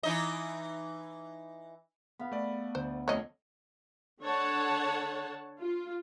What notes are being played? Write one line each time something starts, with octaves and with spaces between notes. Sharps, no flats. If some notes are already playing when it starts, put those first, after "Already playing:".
E3 D#4 D#5
B3 F5 B5
A3 D5
D2 C5
F2 A3 C#5 D#5
D3 C#5 F#5 A5
F4